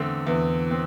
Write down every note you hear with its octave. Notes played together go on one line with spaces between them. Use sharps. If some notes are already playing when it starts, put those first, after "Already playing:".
Already playing: E2 D3 A3 C4
E2
C4